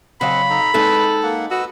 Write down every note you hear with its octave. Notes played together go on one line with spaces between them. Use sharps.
C#3 F#3 C4 D#5 F5 F#5 B5
D#4 A4 A#5
G#3 C4 D#4 A4 B4
A#3 F#5
F#4 B4 D#5 E6